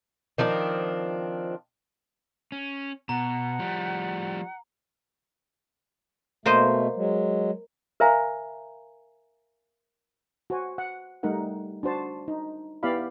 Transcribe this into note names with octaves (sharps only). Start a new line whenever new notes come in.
D#3 F3 C4 D4
C#4
B2 F#5 A#5
F3 G3
B2 A3 A#3 C5 D#5
F#3 G#3
A#4 C5 E5 F5 G#5 A#5
F#4 C5 G#5
F#5
G3 A3 D#4 A#4 F#5
D4 F#4 C5 A5
D#4
B3 E4 G4 D5 F5 B5